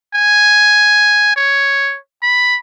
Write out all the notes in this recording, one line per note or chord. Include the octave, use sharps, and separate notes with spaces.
G#5
C#5
B5